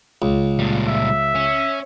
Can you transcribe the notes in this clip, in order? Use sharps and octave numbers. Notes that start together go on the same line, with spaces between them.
C#2
A#2 G3
E5
C#4